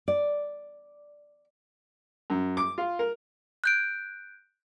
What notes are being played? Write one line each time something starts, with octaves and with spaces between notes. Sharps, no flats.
D5
F#2
D6
F4
A#4
F#6 G6 D7